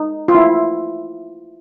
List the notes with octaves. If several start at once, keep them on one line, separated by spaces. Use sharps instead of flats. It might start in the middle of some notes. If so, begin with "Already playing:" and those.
Already playing: D#4
F4
E4